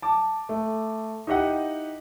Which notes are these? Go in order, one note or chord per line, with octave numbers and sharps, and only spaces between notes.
A5 D6
A3
D#4 E4 G4 D#5 F#5